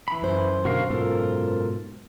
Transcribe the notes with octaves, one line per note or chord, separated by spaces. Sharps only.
E3 B5
F#2 C5
B2 D3 F#4 A#4 F5
G#2 B2 F4 A4 A#4